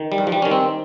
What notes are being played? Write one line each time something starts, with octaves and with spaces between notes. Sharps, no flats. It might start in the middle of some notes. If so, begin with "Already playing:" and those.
Already playing: D#3
G3
G2
F3
G3
D#3 C#4
C4